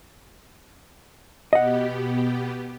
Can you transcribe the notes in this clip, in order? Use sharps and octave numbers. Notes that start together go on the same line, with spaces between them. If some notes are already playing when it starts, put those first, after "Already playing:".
B2 B3 G4 D#5 F#5